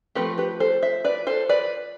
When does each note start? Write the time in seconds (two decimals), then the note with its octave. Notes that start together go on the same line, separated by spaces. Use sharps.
0.15 F3 A3 C4 G4 B4
0.38 G4 B4
0.60 A4 C5
0.83 C5 E5
1.04 B4 D5
1.27 A4 C5
1.49 B4 D5